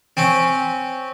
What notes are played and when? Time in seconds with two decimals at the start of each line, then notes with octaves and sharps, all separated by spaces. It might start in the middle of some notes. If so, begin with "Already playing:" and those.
0.17 C4 C#4